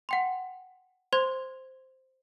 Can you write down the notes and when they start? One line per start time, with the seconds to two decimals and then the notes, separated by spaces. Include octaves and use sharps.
0.09 F#5 G5 C6
1.13 C5 C6 G#6